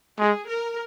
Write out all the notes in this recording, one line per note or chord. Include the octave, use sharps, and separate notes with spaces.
G#3 G#4
A#4